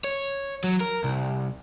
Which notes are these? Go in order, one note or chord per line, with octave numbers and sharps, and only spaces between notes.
C#5
F#3
A#4
C2